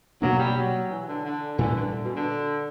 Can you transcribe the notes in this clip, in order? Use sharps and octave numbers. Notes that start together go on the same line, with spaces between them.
B2 F#3 A#3 D4
G3
F#3
E3
D3
D3
A#2 E3 G3 C#4
D3
B2
D3